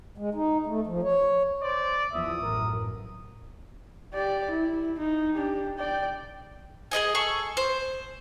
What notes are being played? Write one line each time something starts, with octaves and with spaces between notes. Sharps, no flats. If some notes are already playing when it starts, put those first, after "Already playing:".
G#3
D#4
A3
F3
C#5
C5 D5
E2 F3 E5 D#6
A1 F#2 A#4
G4 D5
E4
D#4
D4 G4
D5 G5
G#4 B4 D#5 G#5
G#4 A4 C#6
C5